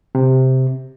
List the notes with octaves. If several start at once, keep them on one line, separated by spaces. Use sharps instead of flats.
C3